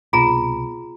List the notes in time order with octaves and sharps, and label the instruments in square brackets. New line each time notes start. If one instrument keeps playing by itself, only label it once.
[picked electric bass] C2 B2 [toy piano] F4 G#4 A#5